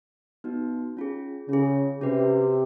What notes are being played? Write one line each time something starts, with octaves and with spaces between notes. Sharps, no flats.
B3 D#4 F#4
C#4 F4 G#4
C#3 C#4 F4 G#4
C3 C#4 F#4 B4